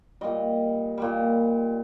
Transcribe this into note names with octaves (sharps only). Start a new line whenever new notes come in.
A#2 G3 D#5
A#2 G3